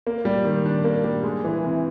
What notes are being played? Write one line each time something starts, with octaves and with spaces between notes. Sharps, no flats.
A#3
G3
D#3
D4
A#3
G3
G#3
E3
C3